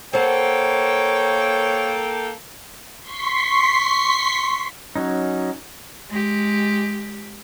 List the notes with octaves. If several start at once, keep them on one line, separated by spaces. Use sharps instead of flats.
A#3 A4 C5 C#5 F#5 G5
C6 C#6 B6 C7
F#3 C#4 D#4
G#3 G4